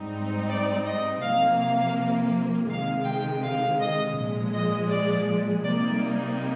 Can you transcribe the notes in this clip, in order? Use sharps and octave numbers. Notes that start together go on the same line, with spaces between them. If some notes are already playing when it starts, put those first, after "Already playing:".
Already playing: G#2 G3 C4 D#4
D5
D#5
C3 F3 A#3 F5
F5
C3 D#3 G#3 F5
G5
F5
D#5
A#2 F3 G#3
D#5
D5
C3 G3 A#3 D#4 D5